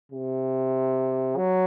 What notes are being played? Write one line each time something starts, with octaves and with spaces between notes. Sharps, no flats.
C3
F#3